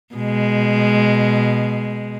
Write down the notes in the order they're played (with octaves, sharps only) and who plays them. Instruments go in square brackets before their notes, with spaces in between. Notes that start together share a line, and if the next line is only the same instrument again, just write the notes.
[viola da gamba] B2 G#3